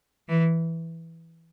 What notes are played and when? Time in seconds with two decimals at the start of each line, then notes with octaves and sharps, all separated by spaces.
0.30 E3